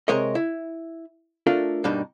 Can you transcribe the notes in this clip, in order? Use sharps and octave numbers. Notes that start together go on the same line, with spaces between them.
C3 G#3 A#4 C#5 D#5
E4
A3 D4 F4 A4 A#4
G2 B2 G3 A#3 D4 D#4